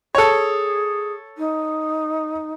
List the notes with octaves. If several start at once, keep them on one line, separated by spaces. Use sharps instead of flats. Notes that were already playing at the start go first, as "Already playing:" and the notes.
G#4 A4 C#5
D#4